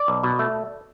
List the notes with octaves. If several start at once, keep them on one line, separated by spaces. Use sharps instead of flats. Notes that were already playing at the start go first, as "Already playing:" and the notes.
Already playing: D5
B1
B2
A3